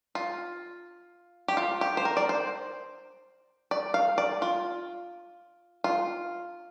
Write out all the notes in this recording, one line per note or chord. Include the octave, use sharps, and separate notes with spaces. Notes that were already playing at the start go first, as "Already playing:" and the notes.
F4
G4
F4
G4
C5
A#4
D5
C5
D5
F5
D5
F4
F4